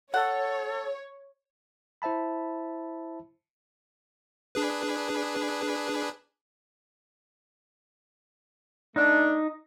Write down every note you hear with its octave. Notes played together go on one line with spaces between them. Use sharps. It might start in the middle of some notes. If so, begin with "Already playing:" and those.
A4 C#5 F#5
E4 C5 E5 A5 B5
D4 G#4 B4
A3 D4 D#4